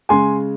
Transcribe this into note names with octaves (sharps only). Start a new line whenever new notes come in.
C#3 G#3 G#5 C6